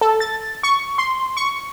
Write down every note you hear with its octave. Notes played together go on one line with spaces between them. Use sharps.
A4
A6
C#6
C6
C#6